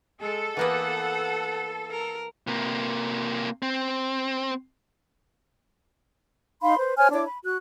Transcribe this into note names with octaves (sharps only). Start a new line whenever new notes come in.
G#3 A4
E3 A#3 B3 F#5
A#4
C3 A#3
C4
D#4 F5 B5 C6
B4 C5
C5 C#5 G#5 F6
D4 E4 C#5 D6
B5
F#4 F#6